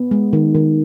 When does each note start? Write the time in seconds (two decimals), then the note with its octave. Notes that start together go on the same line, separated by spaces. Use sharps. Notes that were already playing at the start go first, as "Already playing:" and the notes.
Already playing: B3
0.11 G#3
0.33 D#3
0.55 D#3